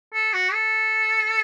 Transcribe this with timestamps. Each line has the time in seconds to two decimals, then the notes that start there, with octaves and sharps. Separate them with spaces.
0.13 A4
0.34 F#4
0.54 A4